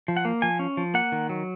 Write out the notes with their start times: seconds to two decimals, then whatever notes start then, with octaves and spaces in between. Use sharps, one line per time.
0.08 F3
0.17 F#5
0.25 A#3
0.42 F3 G#5
0.59 C#4
0.77 F3
0.94 A#3 F#5
1.12 D#3
1.29 F#3